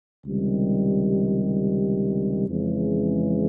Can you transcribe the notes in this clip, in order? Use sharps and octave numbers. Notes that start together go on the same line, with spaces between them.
C#2 C3 D#3 G3
F2 C#3 E3 G#3 C#4